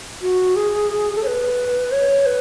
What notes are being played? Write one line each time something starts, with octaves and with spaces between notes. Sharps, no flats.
F#4
G#4
A4
C#5
B4
C#5
B4